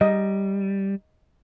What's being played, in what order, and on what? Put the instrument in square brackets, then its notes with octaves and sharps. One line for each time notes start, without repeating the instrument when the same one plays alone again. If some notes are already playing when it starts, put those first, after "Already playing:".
[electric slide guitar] G3 [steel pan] D#5